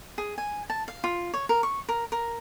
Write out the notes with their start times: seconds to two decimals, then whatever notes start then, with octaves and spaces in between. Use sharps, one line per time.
0.18 G#4
0.38 G#5
0.70 A5
0.88 F5
1.04 F4
1.34 C#5
1.49 A#4
1.63 C#6
1.89 A#4
2.12 A#4